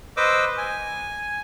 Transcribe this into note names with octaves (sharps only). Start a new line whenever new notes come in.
B4 C5 D#5 D6 E6
G#5